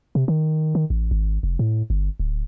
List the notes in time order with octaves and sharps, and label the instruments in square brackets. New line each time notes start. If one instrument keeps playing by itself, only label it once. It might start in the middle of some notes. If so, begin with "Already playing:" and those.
[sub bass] C3
D#3
D#3
A1
G#1
F1
A2
G1
D1